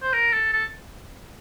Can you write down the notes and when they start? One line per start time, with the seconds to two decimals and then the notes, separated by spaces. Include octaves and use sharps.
0.03 C5
0.13 A#4
0.33 A4
0.53 A4